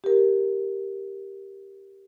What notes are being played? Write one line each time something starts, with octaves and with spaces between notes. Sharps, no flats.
G4 A#4